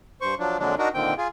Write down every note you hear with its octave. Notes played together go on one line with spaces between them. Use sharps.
G2 C5 C#6
F3 F#3 D4
F2 A#2 D3 F#3 G#3 D4
D4 D#4 F#4 A#4
A#2 D3 D#3 C4 G5
F4 G#4